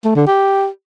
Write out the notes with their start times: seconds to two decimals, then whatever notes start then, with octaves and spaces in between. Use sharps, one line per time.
0.05 A3
0.16 D3
0.27 G4